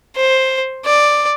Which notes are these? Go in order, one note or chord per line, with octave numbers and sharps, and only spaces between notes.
C5
D5